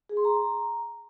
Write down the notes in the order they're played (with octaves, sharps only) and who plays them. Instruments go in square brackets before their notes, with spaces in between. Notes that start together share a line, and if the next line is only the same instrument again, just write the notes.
[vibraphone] G#4
C6
A#5